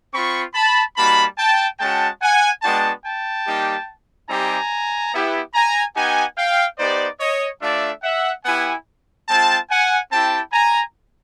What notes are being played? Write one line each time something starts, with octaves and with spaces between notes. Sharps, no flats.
C4 F4 B5 C#6
A5 B5
G3 A#3 D#4 F#4 A5 B5
G5 A5
G#3 C#4 F#4 G5 A5
F#5 G#5
G#3 B3 D4 F#4 G5 A5
G5 A5
G3 A#3 D#4 G4
G3 C4 D#4 G4 G#5 A#5
B3 E4 G4
G#5 A#5
B3 D#4 G4 F#5 G#5
F5 G5
B3 D#4 G4 C5 D5
C#5 D#5
A3 D4 F4 D5 E5
E5 F#5
B3 E4 G4 F#5 G#5
G#3 C4 F4 G5 A5
F#5 G#5
C4 E4 G4 G5 A5
G#5 A#5